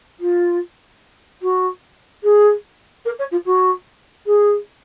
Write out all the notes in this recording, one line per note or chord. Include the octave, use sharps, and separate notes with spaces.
F4
F#4
G#4
A#4
C#5
F4
F#4
G#4